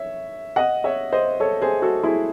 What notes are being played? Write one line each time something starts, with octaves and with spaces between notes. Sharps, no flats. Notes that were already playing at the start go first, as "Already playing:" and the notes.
Already playing: C#5 E5
D#5 F#5
C#5 E5
C5 D#5
A4 C#5
G#4 C5
F#4 A4
E4 G#4